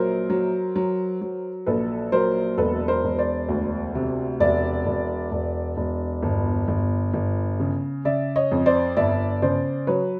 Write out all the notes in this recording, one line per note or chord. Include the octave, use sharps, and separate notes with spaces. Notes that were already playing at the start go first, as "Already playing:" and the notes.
Already playing: A#1 F#3 A#4 C5
F#3
F#3
F#3
A#1 A4 B4
F#3 A#4 C5
E1 A4 B4
A#4 C5
E1
C5 D5
D2
C3
E1 D5 E5
E1
E1
E1
G1
G1
G1
C#3
C#3 D5 E5
C#5 D#5
F2
C5 D5
G1 D5 E5
C#3 C5 D5
F#3 B4 C#5